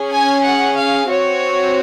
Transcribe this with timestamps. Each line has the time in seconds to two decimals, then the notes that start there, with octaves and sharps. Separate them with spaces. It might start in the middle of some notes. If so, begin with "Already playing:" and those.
Already playing: C#4 G#4
0.12 G#5
0.44 F#5
0.76 F5
1.09 C4 F#4 C#5